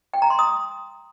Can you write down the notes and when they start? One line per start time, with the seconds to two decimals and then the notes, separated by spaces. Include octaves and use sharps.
0.14 G5
0.22 A#5
0.30 C6
0.39 D#6